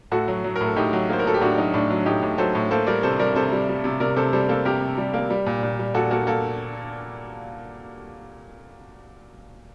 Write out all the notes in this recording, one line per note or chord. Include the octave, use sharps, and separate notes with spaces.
A2 F#4 A4
F#3
F#3
A#4
A2
A4
A2 D#4 G4
F#3
A#3 C5
A#4
F#3 A4
G4
A2 D4 F#4
F#3 D#4
A2 D4
F#3
A2 D#4 G4
A2
F#3 A4 C5
A2
A#3 A4 C5
G3 A#4 D5
C3 A4 C5
G3 A#4 D5
C3 A4 C5
G3
G3
C3
C3 A#4 D5
C3 A4 C5
G3 A4 C5
A#3 A4 C5
C3 G4 A#4
C3
G3
A#3
G3
A#2
A#2
G3
A#2 F#4 A4
A#3 F#4 A4
A#3 A4